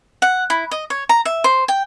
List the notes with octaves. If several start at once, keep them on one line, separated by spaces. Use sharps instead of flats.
F#5
E4
D#5
C#5
A#5
E5
C5
G5